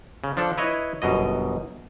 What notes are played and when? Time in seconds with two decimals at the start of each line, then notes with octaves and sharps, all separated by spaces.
0.24 C#3
0.37 F3 D4 A4
0.58 E4 B4 C#5 D#5
1.02 G1 F#2 B2 D#5